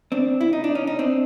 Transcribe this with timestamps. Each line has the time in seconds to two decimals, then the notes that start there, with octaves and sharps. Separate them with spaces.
0.12 C4 D4
0.41 E4
0.53 D#4
0.64 D4
0.75 C#4 D#4
0.87 D#4
0.99 C4 D4